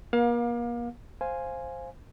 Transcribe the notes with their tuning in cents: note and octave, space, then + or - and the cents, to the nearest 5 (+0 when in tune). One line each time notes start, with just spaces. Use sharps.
A#3 +40 F5 +30
C5 +10 F5 -5 G#5 +0